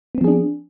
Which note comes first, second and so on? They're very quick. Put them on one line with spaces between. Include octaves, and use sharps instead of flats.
B3 C4 F3 G#4 D4